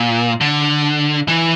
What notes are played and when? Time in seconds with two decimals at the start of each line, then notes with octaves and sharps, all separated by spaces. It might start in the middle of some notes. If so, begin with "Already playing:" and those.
Already playing: A#2
0.41 D3
1.28 E3